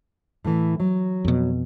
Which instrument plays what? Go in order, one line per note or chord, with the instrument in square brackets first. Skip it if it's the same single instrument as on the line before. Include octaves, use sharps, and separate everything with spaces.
[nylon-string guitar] A2 E3
F#3
[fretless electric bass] F2 B2